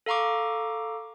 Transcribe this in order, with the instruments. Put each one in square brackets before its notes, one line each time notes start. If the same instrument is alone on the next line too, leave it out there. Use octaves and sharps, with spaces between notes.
[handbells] A4 F5 A#5 C#6 D6